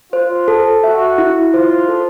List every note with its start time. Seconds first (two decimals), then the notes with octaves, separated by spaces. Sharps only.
0.12 F4 C5
0.48 A4
0.84 F#4 E5
1.18 E4
1.53 F4 C5
1.88 A4